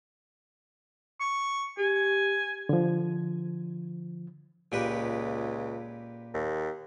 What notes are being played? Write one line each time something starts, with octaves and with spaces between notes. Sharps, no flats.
C#6
G4 G#5
D3 F3
C#2 A#2 G4 B4
D#2